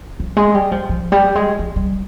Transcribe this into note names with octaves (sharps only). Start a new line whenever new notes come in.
F3
G#3
G3
F3
F3
G3
G#3
F3
G3